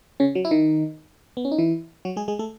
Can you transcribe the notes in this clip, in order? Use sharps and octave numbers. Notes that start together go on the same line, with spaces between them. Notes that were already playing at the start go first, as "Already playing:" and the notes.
C#3 C#4
F#3
E4
D#3 D#4
B3
C#4
D#4
E3 E4
F#3 F#4
G#3 G#4
G#3 G#4
A3 A4